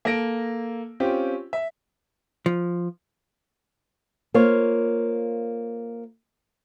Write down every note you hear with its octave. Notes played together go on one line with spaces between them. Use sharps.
A#3 A4 A#6 D7
C4 C#4 F4 G4
E5
F3
A#3 F4 C5 C#5